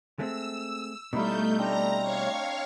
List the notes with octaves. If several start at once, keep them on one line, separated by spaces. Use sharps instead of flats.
G#3 A3 C4 E6
B2 G3 A3 D#4 E4 F5 G6
C4 D4 A#5 A#6
C#5 F5 C#6